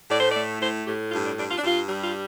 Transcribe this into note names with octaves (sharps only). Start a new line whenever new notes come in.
A2 D5
C5
D5
A3
A2 C5
A2 G4
G2 F4
D4
G2 D4
F4
D4
G2 F4
G3
F4